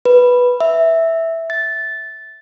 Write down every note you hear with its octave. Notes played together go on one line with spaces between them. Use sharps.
B4
E5
A6